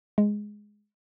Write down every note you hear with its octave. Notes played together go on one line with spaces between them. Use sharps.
G#3